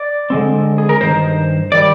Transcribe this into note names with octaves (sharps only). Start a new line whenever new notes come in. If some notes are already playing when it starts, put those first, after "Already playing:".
Already playing: D5
D3 G#3 C4
G#4
A#4
G2 D#3 C5
D#3 G3 D5